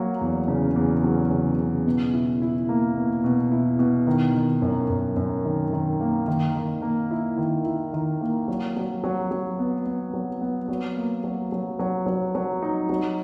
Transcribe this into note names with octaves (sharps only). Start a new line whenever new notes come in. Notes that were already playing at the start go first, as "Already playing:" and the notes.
Already playing: F#3 A#3
E2
C#3
E2
F#3
C#3
C#3
B2
E4
E4
A#3
B2
B2
E4
B2
D#3
D#3
F#2
F#2
F#2
D#3
D#3
A#3
D#3
D#3
A#3
E4
D#3
E4
D#3
A#3
F#3
F#3
F#3
F#3
B3
B3
F#3
B3
F#3
A#3
F#3
F#3
F#3
F#3
F#3
D#4
F#3